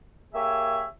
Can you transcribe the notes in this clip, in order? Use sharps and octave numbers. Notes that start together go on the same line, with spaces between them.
A#3 G4 G#4 C#5 E5